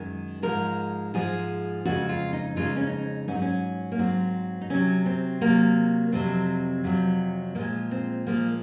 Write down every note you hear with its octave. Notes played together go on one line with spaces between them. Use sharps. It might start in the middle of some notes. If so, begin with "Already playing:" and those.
Already playing: F#2 D#3 G#3
G#2 F3 G#3 A#4
G#2 F3 G#3 G#4
F2 C#3 G#3 F#4
F4
D#4
F2 C#3 G#3 F4
D#4
C#4
D#4
G#2 F#3 C#4 D#4
C#4
A#3
G#2 F#3 C4
D#4
C3 F#3 C#4
C4
C3 F#3 A#3
F2 C3 F#3 C4
F2 C3 F#3
A#2 F3 G#3 A#3
C4
A#2 F3 G#3 A#3